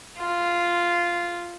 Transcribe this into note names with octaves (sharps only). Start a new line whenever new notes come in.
F4